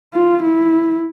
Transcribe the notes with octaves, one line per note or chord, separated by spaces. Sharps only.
F4
E4